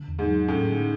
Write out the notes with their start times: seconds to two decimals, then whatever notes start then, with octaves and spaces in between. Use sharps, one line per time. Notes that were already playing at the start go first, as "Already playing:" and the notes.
Already playing: D3
0.08 E2
0.19 G#2
0.28 F#3
0.48 A2 C#4
0.69 D3